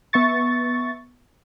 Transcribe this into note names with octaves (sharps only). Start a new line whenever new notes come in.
B3 E5 C#6 A6